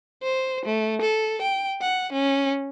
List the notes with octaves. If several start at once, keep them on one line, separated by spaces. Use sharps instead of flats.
C5
A3
A4
G5
F#5
C#4